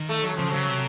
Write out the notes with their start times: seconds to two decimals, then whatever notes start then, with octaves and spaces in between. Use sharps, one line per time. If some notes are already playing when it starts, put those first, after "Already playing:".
Already playing: D#3
0.09 A3
0.22 F#3
0.37 C#3 F3
0.50 C#3 F#3
0.69 C3